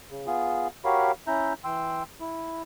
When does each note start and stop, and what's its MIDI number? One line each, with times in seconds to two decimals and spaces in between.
0.10 0.26 49
0.27 0.67 59
0.27 0.67 65
0.27 0.67 68
0.85 1.11 66
0.85 1.11 67
0.85 1.11 70
0.85 1.11 73
0.85 1.11 77
0.85 1.11 83
1.28 1.53 61
1.28 1.53 64
1.28 1.53 76
1.28 1.53 82
1.28 1.53 91
1.64 2.03 52
1.64 2.03 79
1.64 2.03 84
1.64 2.03 88
2.20 2.63 64